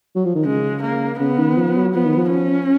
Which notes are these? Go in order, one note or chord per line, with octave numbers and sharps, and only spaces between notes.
F#3
F3
D#3
C#3 G#3
A#3
C#3 B3
D#3
F3
F#3
F3 B3
D#3
F3
C#4